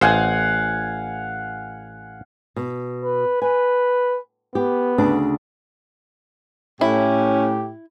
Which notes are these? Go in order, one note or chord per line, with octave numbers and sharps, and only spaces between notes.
A1 C5 F5 F#5 G#5
B2
B4
B4 G#5
B3 G4
D2 C#3 D4
A2 C#4 E4 G4